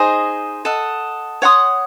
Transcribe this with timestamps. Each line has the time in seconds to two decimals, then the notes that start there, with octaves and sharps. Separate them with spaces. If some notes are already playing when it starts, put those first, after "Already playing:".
Already playing: D#4 G#4 C5 D#5
0.65 A4 D#5 F#5
1.42 C#5 F#5 C6 D#6